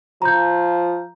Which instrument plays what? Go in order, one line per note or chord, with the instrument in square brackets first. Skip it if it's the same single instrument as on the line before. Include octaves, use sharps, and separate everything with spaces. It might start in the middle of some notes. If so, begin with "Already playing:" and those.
[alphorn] F3 [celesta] A#5 G6